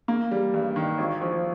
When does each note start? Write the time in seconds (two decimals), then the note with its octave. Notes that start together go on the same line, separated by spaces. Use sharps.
0.08 A#3
0.31 G3
0.54 G2
0.76 D#3
0.98 G#1
1.21 F3